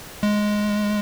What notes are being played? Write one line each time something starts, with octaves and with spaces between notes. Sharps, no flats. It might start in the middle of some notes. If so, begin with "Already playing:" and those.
G#3